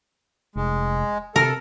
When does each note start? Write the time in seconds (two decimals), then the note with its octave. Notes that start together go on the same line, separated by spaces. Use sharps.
0.56 F1 G#3
1.36 C3 A4 A#4